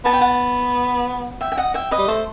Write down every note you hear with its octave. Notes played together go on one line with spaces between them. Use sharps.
B3 A5
G5
F#5 A5
E5 G5
G5
D#5 F#5
E5 G5
B4 D#5
G3
A3 C5